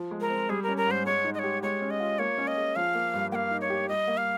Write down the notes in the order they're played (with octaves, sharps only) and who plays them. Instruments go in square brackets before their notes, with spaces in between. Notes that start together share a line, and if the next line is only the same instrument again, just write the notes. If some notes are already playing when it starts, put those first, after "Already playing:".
Already playing: [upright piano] F3
G#3
[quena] A#4
[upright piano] C4
[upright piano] G3 [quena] G#4
[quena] A#4
[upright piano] C#4
[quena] A#4
[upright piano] G#2 [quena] C5
[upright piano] G#3 [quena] C#5
[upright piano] D#4
[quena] D#5
[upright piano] G4 [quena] C#5
[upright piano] G#3 [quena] C#5
[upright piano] C#4
[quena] D#5
[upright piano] F4
[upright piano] A#3 [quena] C#5
[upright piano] C#4
[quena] D#5
[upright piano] G#4
[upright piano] F3 [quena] F5
[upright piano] A#3
G2
[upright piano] A#3 [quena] F5 G5
[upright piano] D#4
[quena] C#5
[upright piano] G4
[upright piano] G3 [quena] D#5
[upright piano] A#3
[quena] F5